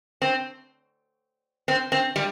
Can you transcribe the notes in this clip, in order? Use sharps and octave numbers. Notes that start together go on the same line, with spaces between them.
C4
C4
C4
G3